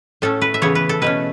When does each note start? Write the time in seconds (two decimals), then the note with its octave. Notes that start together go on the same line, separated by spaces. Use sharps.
0.22 A2 A3 C#4 A4
0.41 B4
0.54 E5
0.62 C#3 E3 B3 C#5
0.75 B4
0.89 A4
1.02 B2 A3 C#4 B4